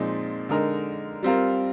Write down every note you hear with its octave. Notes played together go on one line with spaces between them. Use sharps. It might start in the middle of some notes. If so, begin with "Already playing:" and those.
Already playing: A#2 F3 G#3 C4 D#4
D3 G#3 D#4 A#4
G3 C4 F4 A#4